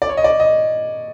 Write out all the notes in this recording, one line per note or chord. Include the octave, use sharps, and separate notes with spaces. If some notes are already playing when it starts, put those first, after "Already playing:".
D5
C#5
D#5
D5
D#5